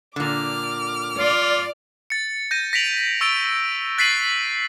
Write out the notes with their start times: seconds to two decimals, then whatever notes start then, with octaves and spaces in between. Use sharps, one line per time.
0.16 A#2 D3 D6 F6
1.19 F4 D5
2.10 A6 C#7
2.51 G6 A#6 D#7
2.73 A#6 B6 D7 F7 F#7
3.21 C#6 E6 A6 D7 G7
3.98 F#6 A6 B6 C7 D#7 F#7